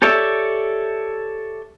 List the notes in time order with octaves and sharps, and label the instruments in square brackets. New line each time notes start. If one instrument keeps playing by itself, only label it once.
[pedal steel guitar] G4 A4 C#5 D5 E5